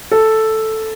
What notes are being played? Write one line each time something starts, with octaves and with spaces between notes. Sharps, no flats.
A4